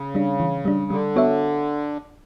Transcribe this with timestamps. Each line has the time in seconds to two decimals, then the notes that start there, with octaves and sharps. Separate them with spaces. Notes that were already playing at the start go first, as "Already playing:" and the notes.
Already playing: C#3
0.15 G3 D4
0.40 E3
0.65 G3 D4
0.90 D3 G3
1.16 B3 F#4 C#5 E5